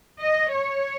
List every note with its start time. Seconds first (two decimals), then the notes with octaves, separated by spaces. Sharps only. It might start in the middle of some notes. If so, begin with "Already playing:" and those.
0.21 D#5
0.53 C#5